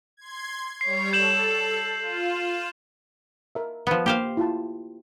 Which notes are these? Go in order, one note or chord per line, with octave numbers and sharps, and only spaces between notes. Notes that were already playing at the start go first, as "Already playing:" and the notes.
C6 G#6
G3 C#5 C7
A4 G6 E7 F#7
F4
A#4 E5
F3 B3
A#3 G4 C5 F5
E4 F4 A5